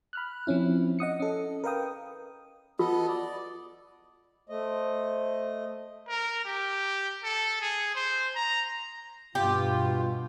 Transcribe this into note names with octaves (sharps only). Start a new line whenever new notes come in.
B5 F6 F#6
F3 C4 C#4 E4
D#5 F#5 D#6 C#7
C#4 A4
A#4 B4 F5 G5 D#6
B3 F4 A4 D#5
D5
A3 C5 D#5
A#4
G4
A4
G#4
C5
A#5
G2 B2 F4 G4